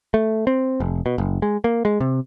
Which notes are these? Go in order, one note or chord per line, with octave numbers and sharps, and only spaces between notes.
A3
C4
F1
B2
F#1
G#3
A#3
G#3
C3